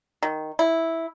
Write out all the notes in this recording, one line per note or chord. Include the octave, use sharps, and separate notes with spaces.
D#3
E4